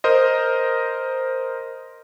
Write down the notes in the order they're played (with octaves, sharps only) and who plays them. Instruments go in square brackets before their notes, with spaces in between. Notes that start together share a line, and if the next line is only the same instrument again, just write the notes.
[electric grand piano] A#4 C5 D#5